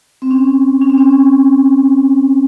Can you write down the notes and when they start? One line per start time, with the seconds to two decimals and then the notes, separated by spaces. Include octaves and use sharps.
0.22 C4
0.31 C#4
0.81 C#4
0.90 C4
0.98 C#4